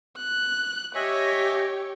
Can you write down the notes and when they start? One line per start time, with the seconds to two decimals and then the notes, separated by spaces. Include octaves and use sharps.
0.17 F#6
0.95 G4 C#5 D#5 E5 G#5